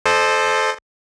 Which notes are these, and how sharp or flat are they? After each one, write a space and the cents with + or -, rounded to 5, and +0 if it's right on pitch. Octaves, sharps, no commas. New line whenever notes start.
A4 -15 C5 +0 D#5 -40